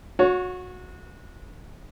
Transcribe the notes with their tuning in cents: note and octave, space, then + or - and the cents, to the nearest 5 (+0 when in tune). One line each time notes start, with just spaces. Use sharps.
F#4 -25 C#5 +10